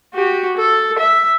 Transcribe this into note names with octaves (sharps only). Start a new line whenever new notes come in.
F#4 G4
A4
E5